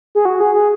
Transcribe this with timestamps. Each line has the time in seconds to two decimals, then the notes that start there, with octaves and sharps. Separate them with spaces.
0.15 G#4
0.25 F#4
0.40 G#4
0.55 G#4